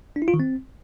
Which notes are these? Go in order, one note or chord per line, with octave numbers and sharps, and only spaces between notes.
D4
E4
F4
D#3
C4